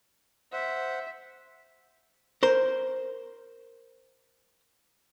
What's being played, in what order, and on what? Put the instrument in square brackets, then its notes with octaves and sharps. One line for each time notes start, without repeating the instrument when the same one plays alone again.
[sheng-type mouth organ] C5 F#5 [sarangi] E5
[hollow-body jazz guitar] A#4 C5